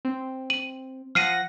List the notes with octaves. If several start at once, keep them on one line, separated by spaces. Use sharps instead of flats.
C4
D#7 F#7
F3 F#5 F6 A#6 C7 D#7